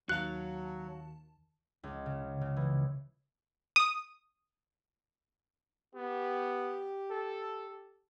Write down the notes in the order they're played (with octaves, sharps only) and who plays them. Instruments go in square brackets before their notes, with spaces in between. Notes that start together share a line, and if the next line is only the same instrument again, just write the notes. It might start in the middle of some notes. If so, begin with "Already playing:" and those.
[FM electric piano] D#2 D#3 A5 [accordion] F#3 [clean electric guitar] F#4 F5 [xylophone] F#6
[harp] C#2
C#3
C#3
E3
[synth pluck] D#6
[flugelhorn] B3 [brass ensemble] G4
[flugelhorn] A4